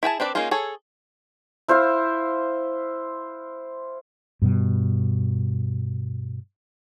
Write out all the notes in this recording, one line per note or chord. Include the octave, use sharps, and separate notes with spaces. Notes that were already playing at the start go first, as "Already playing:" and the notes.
E4 G#4 G5 A5
C4 D4 B4 D5
A#3 C#4 D#4 F4 G#4
G#4 A4 C#5
E4 C5 E5 F5
G2 B2 G3